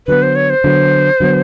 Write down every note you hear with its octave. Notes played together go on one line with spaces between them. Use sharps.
D3 F#3 B3 B4
C5
C#5
C5
D3 F#3 B3
D3 F#3 B3